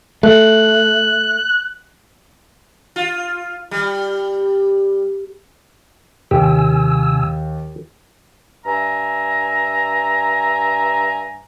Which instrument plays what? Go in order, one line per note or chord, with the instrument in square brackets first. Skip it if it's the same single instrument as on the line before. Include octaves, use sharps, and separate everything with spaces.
[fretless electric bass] A3 [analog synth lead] F#6
[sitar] F4
G3
[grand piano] D#2 [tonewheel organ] C3 G#5 E6 [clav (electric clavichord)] G4
[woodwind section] G2 E5 G#5 A#5